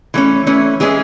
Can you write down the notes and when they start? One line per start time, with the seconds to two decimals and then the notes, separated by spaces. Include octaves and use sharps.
0.14 E3 A3 C#4
0.47 E3 A3 C#4
0.80 E3 G#3 C#4 G#4